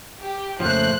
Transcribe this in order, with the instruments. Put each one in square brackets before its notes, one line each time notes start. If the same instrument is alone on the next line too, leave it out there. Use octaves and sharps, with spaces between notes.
[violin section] G4
[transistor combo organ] F2 A#2 C#3 [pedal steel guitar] F3 A3 [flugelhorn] C5 [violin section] F#6